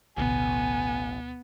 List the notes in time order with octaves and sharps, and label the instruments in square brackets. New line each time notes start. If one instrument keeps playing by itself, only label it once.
[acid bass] A1 [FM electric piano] D2 B2 [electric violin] B3 [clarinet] G#5